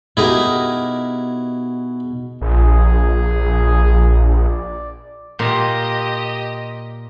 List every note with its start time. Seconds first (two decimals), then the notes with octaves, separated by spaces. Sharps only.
0.17 B2 D#4 E4 G4 G#4 A#4
2.41 A#1 G#4
4.48 D5
5.39 A#2 G4 D#5